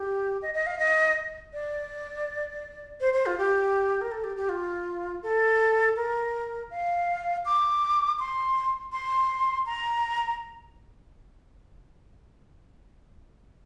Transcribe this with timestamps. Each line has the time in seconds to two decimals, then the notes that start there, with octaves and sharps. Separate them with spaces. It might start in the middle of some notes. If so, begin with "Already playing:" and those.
Already playing: G4
0.42 D#5
0.54 D#5
0.67 F5
0.79 D#5
1.53 D5
3.01 C5
3.14 C5
3.26 F4
3.38 G4
4.01 A#4
4.12 A4
4.24 G4
4.36 G4
4.49 F4
5.23 A4
5.96 A#4
6.70 F5
7.45 D6
8.19 C6
8.92 C6
9.66 A#5